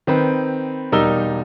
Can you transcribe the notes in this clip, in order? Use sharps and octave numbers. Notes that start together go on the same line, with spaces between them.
D#3 C4 B4
E1 G3 D#4 A#4 E6 G7